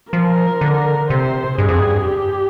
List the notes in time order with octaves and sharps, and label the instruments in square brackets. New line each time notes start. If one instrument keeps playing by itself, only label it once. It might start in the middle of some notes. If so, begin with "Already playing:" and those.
[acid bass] F3 [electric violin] A#4
[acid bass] D3
[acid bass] C3 [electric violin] C5
[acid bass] G2 [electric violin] G#4
[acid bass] F2
G2
[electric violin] G4